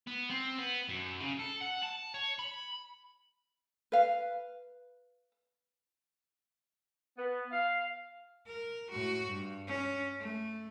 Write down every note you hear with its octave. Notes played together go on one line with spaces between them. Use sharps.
B3
C4
B3
F#2
C#3
A4
F#5
A5
C#5
B5
B4 F5
B3
F5
A#4
A2 F#4
G2
C#4
A3